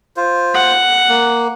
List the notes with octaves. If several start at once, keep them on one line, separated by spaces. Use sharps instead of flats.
F4 C5
F#5
A#3